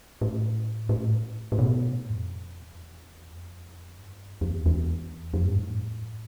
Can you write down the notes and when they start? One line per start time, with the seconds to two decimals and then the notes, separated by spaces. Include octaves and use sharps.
0.21 A2
0.89 A2
1.52 A2
1.59 B2
1.92 A2
2.09 F2
2.60 E2
3.29 F2
3.98 G2
4.41 F2
4.48 E2
4.66 E2
5.34 F2
5.45 G2
5.56 A2